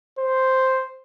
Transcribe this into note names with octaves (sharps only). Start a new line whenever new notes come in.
C5